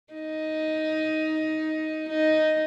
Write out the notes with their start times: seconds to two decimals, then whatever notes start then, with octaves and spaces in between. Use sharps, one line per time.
0.13 D#4
2.09 D#4